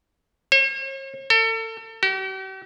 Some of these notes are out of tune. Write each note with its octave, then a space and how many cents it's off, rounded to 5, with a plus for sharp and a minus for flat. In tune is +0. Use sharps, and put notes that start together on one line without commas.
C#5 -45
A4 +35
G4 -45